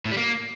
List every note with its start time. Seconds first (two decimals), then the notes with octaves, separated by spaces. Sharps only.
0.05 A2
0.11 G3
0.17 A#3